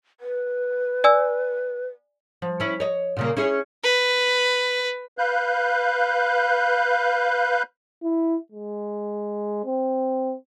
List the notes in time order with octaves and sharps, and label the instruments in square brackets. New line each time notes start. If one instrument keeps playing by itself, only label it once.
[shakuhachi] B4
[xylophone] D5 G#5 E6
[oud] F3
C#4 E4
C#5 D#5
A#2 C#3 A#3
C#4 E4 G#4
[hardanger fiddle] B4
[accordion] B4 F5 F#6 G6
[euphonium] E4
G#3
C4